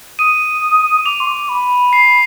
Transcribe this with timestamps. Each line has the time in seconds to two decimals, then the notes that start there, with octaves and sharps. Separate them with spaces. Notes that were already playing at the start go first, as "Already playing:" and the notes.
0.19 D#6 D#7
1.05 D6 F7
1.20 C6
1.27 D6
1.49 B5
1.93 C7